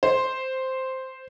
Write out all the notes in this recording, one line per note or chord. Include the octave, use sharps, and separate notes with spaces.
C5